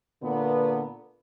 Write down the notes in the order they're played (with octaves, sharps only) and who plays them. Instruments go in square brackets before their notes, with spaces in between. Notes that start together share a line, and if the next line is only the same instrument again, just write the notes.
[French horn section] A#2 D3 B3